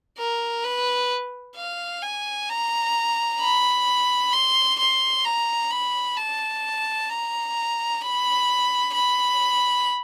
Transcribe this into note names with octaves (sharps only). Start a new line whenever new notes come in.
A#4
B4
F5
G#5
A#5
B5
C6
C6
A#5
B5
A5
A#5
B5
B5